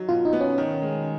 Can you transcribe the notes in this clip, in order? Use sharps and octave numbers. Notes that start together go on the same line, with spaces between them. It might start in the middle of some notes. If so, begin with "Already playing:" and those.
Already playing: F#3 D#4
B2 F4
D#4
B3
C#4
D#3
G#3